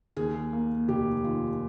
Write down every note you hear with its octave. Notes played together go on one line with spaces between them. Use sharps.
D#2 G#4
A#3
F1 G4
D#3 F4